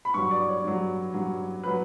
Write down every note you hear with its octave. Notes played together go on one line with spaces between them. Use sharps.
B5
G2 F#3 C#6
D5
C#5
G2 F#3
G2 F#3
F#3 B4